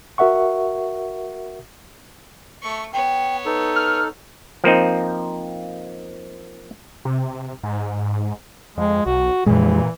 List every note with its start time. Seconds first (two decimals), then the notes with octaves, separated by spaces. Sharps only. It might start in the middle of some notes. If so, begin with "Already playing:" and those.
0.18 F#4 A#4 E5 F#5 C#6
2.62 A3 C#6
2.93 B3 C#5 G5
3.46 D#4 A4 B4
3.76 F6
4.64 F3 A#3 C4 D#4
7.05 C3
7.63 G#2
8.78 F2 G#3
9.06 B1 F#4
9.46 F2 A#2 E3 G#3